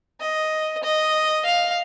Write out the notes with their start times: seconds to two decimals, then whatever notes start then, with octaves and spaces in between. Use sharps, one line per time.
0.20 D#5
0.83 D#5
1.45 F5